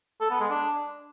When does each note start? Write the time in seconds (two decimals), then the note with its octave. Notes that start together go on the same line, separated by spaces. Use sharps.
0.21 A4
0.30 B3
0.40 G#3
0.50 D4